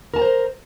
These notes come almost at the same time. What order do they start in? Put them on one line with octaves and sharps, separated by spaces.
A#4 A5 A#5 C5